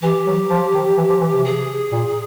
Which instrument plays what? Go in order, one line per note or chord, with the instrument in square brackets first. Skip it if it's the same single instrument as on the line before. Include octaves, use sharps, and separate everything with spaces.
[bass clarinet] E3 [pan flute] G4
[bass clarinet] F#3
F3
D#3
E3
F3
E3
C3
[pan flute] G#4
[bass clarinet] A#2